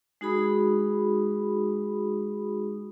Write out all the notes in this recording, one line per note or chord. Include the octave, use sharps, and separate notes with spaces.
G#3 D#4 F#4 G#4 B5 D#6